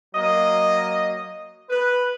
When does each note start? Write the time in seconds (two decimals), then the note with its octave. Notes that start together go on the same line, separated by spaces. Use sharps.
0.15 F#3 A#3 D#5
1.70 B4